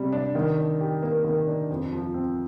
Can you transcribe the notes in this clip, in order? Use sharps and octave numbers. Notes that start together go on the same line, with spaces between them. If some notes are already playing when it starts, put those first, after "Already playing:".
Already playing: C3 G3
D4
D#3
D4
G4
A#3
D#3
D4
F2
F3
C4